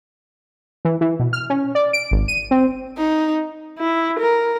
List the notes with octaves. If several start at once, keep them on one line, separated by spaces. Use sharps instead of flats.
E3
E3
B2
F6
C#4
D5
D7
G#1
D#7
C4
D#4
E4
A#4